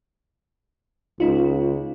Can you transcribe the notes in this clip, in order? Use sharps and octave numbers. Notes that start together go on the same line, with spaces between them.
C#2 D#4 F4